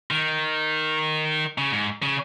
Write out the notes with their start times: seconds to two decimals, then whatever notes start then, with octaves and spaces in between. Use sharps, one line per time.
0.11 D#3
1.58 C#3
1.72 G#2
2.02 C#3